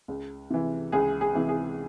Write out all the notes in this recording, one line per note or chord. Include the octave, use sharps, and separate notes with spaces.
C#2
C3 E3
C#2 G#4
G#4
C3 E3
G#4